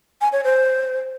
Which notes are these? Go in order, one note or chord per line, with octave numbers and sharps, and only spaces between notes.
G#5
C#5
C5